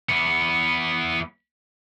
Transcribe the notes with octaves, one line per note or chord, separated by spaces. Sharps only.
E2 B3